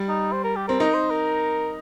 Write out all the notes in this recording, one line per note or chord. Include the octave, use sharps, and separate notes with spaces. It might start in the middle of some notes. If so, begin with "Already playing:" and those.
Already playing: G3
D#4
C5
A#4
G4
C4 A#4
D#4 A#4
C5
A#4